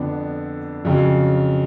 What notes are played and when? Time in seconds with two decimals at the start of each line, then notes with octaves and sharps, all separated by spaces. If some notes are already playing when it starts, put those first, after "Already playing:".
Already playing: F2 D3 F3 B3 D4
0.85 F2 C#3 F#3